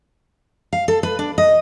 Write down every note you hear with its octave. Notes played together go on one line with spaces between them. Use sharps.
F5
A4
B4
D4
D#5